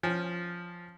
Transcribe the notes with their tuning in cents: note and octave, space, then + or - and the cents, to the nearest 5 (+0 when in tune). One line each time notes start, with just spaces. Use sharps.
F3 +0 C#4 +0 G#5 -35